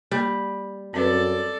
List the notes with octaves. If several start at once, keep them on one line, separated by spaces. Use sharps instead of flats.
G3 A#3
F#2 C4 C#4 A4 B4 D5